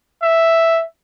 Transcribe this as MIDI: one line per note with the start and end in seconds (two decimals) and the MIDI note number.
0.23 0.83 76